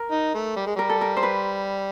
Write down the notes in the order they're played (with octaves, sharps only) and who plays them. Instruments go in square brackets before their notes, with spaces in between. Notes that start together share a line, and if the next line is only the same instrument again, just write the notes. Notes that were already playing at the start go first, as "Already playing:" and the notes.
Already playing: [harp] A#4
[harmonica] D#4
A3
G3
G#3
[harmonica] G3 [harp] A#4
[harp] A4
A#4
C5
B4